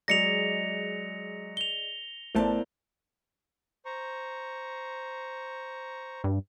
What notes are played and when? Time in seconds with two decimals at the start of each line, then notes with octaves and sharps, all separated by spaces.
0.08 F#3 G#3 G#4 D5 D#5 A#6 C#7 F7
1.57 F7 G7
2.35 A1 A3 B3 E4 A#4 C5 D5 A5
3.85 C5 A#5 C#6
6.24 G2